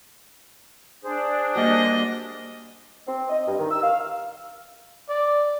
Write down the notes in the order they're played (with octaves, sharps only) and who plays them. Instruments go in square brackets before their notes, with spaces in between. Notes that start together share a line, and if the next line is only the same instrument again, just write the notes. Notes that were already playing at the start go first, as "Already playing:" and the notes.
[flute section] D4 [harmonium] G#4 C5
[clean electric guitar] G3 A#3 F#4 [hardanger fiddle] D#5
[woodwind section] C4
D#5
G2
D#3
E6
F5
[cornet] D5